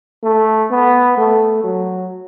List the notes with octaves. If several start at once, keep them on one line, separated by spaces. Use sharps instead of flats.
A3
B3
A3
F#3